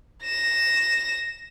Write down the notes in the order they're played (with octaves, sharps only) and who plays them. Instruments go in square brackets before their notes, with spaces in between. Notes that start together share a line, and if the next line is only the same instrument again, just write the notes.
[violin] A#6 E7